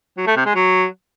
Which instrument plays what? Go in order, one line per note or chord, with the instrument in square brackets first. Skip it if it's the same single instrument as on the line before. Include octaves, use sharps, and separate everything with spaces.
[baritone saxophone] F#3
A3
C3
G#3
F#3